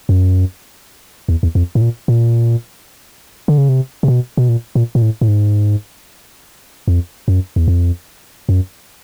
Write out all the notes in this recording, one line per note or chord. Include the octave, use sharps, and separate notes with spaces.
F#2
E2
E2
F2
A2
A#2
A#2
D3
C#3
C3
C3
B2
B2
A#2
A#2
A#2
A2
A2
G#2
F2
F#2
E2
F2
F#2